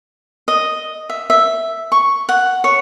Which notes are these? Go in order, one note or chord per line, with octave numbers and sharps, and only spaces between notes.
D#5
E5
E5
C#6
F#5
C#5